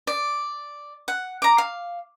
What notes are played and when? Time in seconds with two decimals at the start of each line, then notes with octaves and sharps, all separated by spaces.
0.07 D5
1.08 F#5
1.42 A#5 D6
1.58 F5